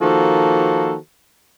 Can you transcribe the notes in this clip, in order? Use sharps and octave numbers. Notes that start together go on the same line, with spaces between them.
D#3 F3 A#3 F#4 A4 C5